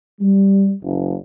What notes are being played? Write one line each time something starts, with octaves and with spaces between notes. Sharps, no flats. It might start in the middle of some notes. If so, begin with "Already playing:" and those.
G3
F#1